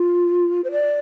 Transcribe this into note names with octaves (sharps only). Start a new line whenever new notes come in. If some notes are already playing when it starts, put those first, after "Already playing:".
Already playing: F4
C5
D5